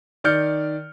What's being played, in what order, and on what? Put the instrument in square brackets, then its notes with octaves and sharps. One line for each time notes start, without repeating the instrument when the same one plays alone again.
[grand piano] D#3 D5 F6 G6 C#7